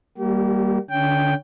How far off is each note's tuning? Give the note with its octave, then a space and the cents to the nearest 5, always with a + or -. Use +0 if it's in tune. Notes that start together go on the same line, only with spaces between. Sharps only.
G3 +5 A#3 +0 G4 -40
D3 +0 C#4 +25 G5 +0